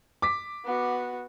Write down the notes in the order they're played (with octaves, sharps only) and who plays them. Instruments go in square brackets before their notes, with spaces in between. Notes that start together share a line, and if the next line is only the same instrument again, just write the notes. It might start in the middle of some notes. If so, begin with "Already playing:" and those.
[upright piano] D6 B6
[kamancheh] B3 F#4